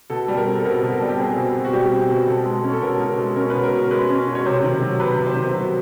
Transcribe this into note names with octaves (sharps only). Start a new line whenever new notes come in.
B2 A4
G3
A#4
C4
A4
B2 A#4
B2
A4
G3
G4
C4 G#4
B2
B2
F#4
G3 G4
C4
B2
B2 A4
G#3
C#4
A4
B2 A#4
B2
G#3
C#4 A#4
B2 B4
A#4
B2
G#3 B4
C#4
B2
C#5
C3 C5
D#3
F#3
C3 B4
C3
C5
D#3
F#3